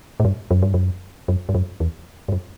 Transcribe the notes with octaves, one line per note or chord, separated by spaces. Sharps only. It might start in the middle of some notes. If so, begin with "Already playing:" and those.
A2
G2
F#2
G2
F#2
F#2
G2
F#2
E2
G2
F#2